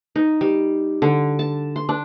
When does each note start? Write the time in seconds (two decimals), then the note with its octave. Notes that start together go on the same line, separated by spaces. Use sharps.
0.16 D#4
0.41 G3
1.02 D3
1.39 A5
1.76 C6
1.89 D4